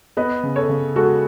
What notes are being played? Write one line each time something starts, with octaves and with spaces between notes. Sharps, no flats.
B3 B4 D#5
C#3
A4 C#5
C#3
G#3 F#4 A4